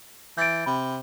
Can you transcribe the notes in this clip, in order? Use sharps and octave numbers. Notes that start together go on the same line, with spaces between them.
E3 G6 A6 D7
C3 B5